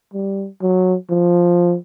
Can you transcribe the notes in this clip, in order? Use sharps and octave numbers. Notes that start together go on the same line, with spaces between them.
G3
F#3
F3